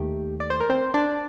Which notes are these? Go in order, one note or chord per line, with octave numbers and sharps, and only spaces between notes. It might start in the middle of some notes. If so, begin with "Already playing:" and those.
Already playing: D#2 D#3 A3 G4
D5
C5
A#4
C4 C5
D4 D5